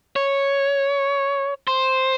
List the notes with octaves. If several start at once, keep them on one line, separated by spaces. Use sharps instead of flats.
C#5
C5